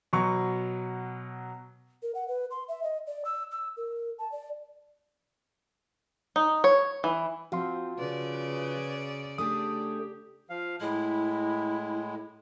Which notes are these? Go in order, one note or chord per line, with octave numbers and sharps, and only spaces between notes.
B2 F#3 C#6
A#4
F#5
B4
C6
E5
D#5
D5
E6
E6
A#4
A5
D5
D#4
C#5
E3
F3 C4 F#4 F5 C6
C#3 B4 D5
A3 D4 G4 G#4 D#6
F3 F5
A2 G#3 E4